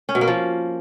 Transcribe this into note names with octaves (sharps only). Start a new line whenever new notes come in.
C#4
B2
A#3
F3